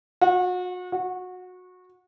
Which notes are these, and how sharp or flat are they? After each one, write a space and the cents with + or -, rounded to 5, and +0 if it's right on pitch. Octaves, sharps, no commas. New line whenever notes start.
F#4 -35
F#4 -20